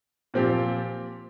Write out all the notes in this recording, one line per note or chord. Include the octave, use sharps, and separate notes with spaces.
A#2 F3 C4 G4